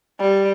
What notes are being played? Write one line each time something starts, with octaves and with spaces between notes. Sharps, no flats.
G3